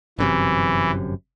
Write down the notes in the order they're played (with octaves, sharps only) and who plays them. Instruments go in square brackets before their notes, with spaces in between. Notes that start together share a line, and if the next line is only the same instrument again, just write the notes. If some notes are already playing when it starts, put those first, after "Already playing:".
[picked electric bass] G1 F#2 C3 [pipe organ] E3